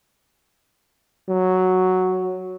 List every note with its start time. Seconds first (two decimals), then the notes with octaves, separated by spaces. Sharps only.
1.29 F#3